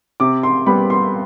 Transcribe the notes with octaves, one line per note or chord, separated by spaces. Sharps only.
C3 D6
C6
G3 B3 B5
C6